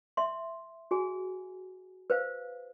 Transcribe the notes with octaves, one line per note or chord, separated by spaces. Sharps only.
E5 C6
F#4 G#4 G#5
B4 C5 F5